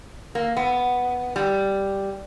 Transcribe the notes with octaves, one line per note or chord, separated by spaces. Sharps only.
A#3
B3
G3